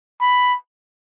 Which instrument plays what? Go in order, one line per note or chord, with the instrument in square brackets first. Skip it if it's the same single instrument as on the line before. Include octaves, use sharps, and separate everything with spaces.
[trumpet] B5